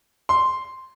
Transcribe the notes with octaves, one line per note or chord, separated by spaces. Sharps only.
C6